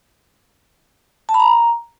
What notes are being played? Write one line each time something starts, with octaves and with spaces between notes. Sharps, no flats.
A5
B5
A#5